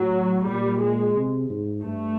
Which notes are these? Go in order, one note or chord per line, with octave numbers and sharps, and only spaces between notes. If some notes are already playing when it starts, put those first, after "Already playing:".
Already playing: A2 F#3
A#2 G3
G#3
C3
G#2
G2 A3